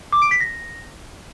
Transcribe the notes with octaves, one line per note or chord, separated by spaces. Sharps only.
D6
D7
B6
A#6